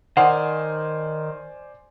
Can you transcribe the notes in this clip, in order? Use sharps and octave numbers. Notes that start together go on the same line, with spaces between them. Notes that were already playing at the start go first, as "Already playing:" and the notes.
D#3 C5 D5 F#5 G#5